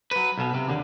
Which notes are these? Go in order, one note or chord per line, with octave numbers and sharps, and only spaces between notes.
F#3 B4
B1 B2
C3
D#2 D3